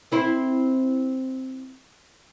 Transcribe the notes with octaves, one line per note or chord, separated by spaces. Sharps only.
C4 E4 C5